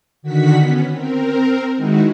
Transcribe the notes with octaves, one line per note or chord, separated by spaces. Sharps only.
D3 D#3 F#4 F#5 B6
B3 C#4
C4 A#4
D#3 G#3 D#4 E4 F#4